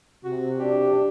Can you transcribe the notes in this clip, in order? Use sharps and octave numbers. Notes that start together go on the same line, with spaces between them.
C3 F#4
D4 G4